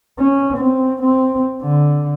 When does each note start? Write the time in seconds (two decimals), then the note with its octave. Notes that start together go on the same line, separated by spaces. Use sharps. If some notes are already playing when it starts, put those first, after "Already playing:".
0.19 C#4
0.57 C4
1.02 C4
1.62 D3